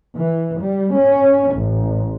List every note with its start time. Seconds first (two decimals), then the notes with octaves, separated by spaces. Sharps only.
0.16 E3
0.63 G3
0.96 C#4
1.54 A1